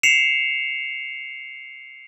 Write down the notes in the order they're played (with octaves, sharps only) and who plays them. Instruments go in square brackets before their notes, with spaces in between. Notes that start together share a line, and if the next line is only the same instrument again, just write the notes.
[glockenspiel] C7 C#7 E7 F7